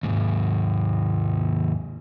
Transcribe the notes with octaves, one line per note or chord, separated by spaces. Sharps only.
D#2 G#2